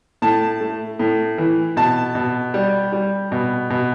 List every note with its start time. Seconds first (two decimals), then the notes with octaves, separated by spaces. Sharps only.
0.22 A2 A5
0.61 A3
0.99 A2
1.38 E3
1.77 B2 A5
2.15 B2
2.54 G3
2.93 G3
3.32 B2
3.70 B2